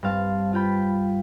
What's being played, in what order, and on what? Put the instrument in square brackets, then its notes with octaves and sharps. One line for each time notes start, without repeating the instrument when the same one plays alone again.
[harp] G2 C4 F5 A5
F4 F5 G5 B5